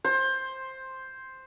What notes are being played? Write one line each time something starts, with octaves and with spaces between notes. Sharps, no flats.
C5